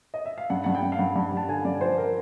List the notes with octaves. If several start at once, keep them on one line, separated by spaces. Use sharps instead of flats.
D#5
E5
F5
G2 F#5
G2 F#5
G5
G2
F5
G2 F#5
G2
G2 A5
D3 G#5
G2 D5
F3 C5
A#4